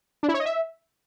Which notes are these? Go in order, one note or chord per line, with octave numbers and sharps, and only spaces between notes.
D4
E4
C#5
D#5
E5